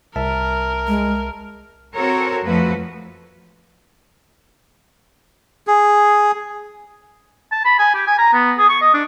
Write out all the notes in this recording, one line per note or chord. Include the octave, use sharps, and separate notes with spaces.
C2 A#4 E5 A5
G#3
C4 F#4 A4 A#4 C#5
F2 F3 A3 F#4 B4
G#4
A5
B5
G#5
G4
G#5
A#5
B3
G#4
C#6
D#5
D4